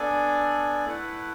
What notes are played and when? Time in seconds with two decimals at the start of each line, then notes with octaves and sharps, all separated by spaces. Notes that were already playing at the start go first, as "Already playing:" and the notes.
Already playing: B3 D4 A4 D5 G#5
0.85 A3 E4 B4 F#5